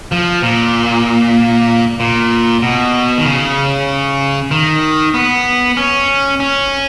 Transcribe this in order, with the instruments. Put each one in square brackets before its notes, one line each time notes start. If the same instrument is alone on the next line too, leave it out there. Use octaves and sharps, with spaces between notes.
[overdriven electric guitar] F3
A#2
A#2
B2
D#3
C#3
D#3
B3
C#4
C#4